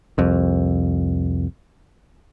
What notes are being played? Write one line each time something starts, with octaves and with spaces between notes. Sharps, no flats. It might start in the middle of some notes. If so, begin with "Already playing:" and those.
C2 F2